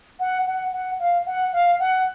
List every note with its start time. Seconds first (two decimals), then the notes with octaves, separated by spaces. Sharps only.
0.19 F#5
0.46 F#5
0.72 F#5
0.99 F5
1.26 F#5
1.53 F5
1.80 F#5